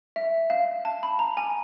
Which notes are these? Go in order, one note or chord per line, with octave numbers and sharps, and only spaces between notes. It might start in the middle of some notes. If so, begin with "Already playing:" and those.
E5
F5
A5
B5
A#5
G#5